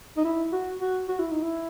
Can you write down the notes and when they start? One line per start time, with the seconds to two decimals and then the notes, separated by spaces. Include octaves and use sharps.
0.17 D#4
0.24 E4
0.52 F#4
0.80 F#4
1.08 F#4
1.19 E4
1.31 D#4
1.42 E4